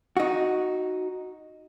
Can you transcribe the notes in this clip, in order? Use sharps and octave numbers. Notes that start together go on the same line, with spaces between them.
D#4 F#4